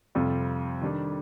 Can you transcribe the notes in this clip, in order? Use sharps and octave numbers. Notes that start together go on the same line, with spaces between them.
F2 C3 G3 C4 F4
D#3 G3 D4